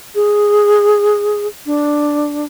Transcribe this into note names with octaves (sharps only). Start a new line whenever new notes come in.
G#4
D4